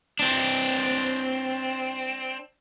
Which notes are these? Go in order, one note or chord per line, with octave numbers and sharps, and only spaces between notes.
C4 D4